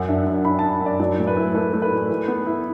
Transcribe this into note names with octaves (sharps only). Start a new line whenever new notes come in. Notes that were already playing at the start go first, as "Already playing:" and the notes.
Already playing: F#2 F#5
D4 E5
F#2
D4 B5
D4 A5
F#2 D5
F#3 D5
A2
B4
E4
A3 B4
A3
B4
A2
E3
B3
E4